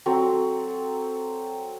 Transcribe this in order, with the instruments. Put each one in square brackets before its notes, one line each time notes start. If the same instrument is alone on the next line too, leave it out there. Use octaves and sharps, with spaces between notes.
[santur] F#3 C4 A4